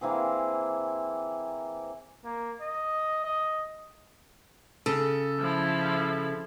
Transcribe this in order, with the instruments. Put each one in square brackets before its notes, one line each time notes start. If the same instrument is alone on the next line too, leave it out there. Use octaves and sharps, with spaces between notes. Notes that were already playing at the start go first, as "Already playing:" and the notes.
[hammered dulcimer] E3 A#3 C4 G#4
[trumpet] A#3
D#5
D#5
[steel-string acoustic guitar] C#3 [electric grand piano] A4
[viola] F3 E4